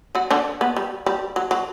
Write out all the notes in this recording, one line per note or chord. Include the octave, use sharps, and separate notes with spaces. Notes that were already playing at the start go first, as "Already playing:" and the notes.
F#3 F#4
D3 D4
B3
G3
G3
F#3
F#3